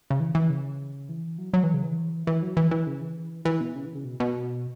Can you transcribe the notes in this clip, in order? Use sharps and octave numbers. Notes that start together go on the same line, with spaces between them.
C#3
E3
E3
C#3
E3
F#3
F#3
E3
C#3
E3
E3
F#3
E3
E3
C#3
E3
E3
B2
C#3
E3
C#3
B2
B2